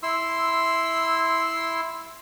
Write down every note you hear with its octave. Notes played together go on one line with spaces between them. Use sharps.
E4 C6 E6